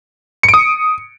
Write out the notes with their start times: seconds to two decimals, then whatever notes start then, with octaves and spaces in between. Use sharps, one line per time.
0.43 C#7
0.48 D7
0.54 D#6